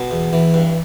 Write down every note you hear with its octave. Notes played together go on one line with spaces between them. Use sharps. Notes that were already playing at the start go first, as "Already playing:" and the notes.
Already playing: B2
E2
E3
G2